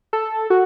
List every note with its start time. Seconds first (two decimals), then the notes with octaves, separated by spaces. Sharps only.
0.13 A4
0.50 F#4